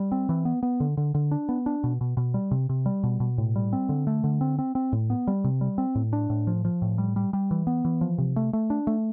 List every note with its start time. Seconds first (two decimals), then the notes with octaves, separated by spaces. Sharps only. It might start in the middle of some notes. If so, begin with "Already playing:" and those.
Already playing: G3
0.12 C4
0.29 E3
0.45 B3
0.63 B3
0.80 D3
0.97 D3
1.14 D3
1.31 D4
1.49 B3
1.66 D4
1.84 B2
2.01 B2
2.17 B2
2.34 G3
2.51 C3
2.69 C3
2.86 G3
3.03 B2
3.20 B2
3.38 A2
3.56 G3
3.73 C4
3.89 D3
4.07 A3
4.24 D3
4.41 C4
4.59 C4
4.75 C4
4.93 A2
5.10 B3
5.27 G3
5.44 C3
5.61 G3
5.78 C4
5.95 A2
6.13 D4
6.30 A2
6.47 F3
6.65 F3
6.82 A2
6.98 G3
7.16 G3
7.33 G3
7.51 E3
7.67 B3
7.85 E3
8.01 F3
8.18 C3
8.36 A3
8.53 A3
8.70 D4
8.87 A3